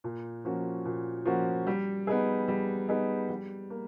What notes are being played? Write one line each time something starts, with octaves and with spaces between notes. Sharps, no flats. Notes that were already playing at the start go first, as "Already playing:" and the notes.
A#2
F3 A#3 C#4 F#4
A#2
F3 A#3 C#4 F#4
G3
B3 D#4 G#4
G3
B3 D#4 G#4
G3
A#3